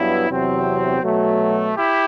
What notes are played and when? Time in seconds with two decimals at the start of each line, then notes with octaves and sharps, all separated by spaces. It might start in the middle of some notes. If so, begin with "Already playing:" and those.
Already playing: G2 F#3 B3 E4
0.30 E2 C3 F#3 C4
1.03 B2 F#3 A3
1.76 E4 G4